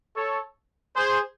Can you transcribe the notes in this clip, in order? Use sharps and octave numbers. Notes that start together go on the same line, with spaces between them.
A4 C#5
G#4 C5